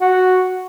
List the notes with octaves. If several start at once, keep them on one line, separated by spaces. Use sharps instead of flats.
F#4